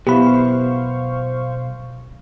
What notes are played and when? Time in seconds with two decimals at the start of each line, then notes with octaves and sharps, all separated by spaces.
0.07 B1 B3 E4 G4 C5 F5 B5 C#6